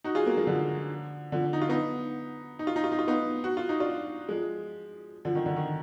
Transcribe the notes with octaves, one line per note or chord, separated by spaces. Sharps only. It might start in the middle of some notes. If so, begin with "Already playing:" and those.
D#4 F#4
F4 G#4
F#3 A#3
F3 G#3
D3 F3
D3 F3
D#4
F4
B3 D#4
D#4
F4
D#4
F4
D#4
F4
B3 D#4
F#4
F4
D#4
D4 F4
F3 G#3
D3 F3
D#3
D3
D#3